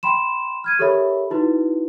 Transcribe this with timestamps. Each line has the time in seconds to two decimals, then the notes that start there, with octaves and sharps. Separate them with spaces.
0.03 G5 B5 C6 E7
0.64 F6 G#6 D#7
0.79 G4 A4 A#4 C#5 E5 B5
1.30 D#4 E4 F#4 B4